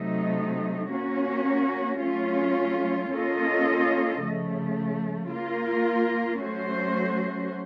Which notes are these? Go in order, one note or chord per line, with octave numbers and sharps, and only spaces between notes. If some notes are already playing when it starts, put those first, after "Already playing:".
Already playing: C3 F#3 A3 D#4
A#3 C#4 F#4
F#3 A3 C#4 F4
A#3 C#4 F4 A4 D#5
C#3 F3 A3
A#3 F4 A#4
F#3 A3 C#4 F#4 C5